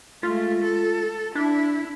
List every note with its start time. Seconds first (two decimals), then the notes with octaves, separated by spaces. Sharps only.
0.23 G#3 A3 F4
0.64 A4
1.35 D4 E4